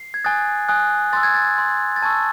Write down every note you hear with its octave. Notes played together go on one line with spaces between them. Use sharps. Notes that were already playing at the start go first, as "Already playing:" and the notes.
Already playing: C7
G#6
G#5 D#6 F#6 A6
G#5 D#6 F#6
C6 E6 A6
G#6
A6
C6 E6
A6
A5 C#6 E6 G#6